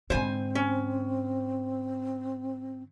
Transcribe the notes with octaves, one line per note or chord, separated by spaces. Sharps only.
G#2 D3 C4 C5 G#5
C#4